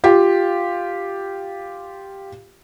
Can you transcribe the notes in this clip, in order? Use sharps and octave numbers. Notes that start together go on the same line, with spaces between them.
F4 G4